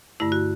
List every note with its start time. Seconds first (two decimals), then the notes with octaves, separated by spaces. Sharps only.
0.20 G2 D3 A3 E4
0.32 F#4